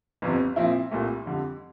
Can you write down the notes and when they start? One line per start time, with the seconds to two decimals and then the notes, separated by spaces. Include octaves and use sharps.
0.22 G1 F2 C3
0.56 A#2 F3 C4 E4
0.91 C2 A#2 A3
1.26 F2 D3 G3